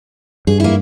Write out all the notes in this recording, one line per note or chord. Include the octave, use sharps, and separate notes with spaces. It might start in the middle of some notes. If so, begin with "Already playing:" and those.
G2 G#4
A#3 E4